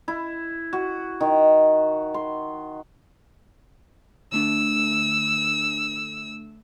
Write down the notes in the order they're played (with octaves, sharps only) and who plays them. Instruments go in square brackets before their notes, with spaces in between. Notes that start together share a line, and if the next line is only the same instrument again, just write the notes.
[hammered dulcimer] E4
F#4
D#3
C6
[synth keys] D3 A3 D4 [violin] E6